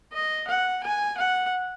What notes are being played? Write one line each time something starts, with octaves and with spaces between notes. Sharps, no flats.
D#5
F#5
G#5
F#5